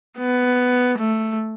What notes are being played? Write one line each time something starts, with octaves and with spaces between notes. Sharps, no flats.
B3
A3